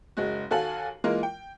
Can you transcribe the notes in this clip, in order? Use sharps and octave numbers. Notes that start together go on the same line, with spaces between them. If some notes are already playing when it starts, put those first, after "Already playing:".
F#1 G#3 F#4
D#2 F#4 A4 F5 G#5 F#7
E3 G#3 A#3 F4 A#4
G5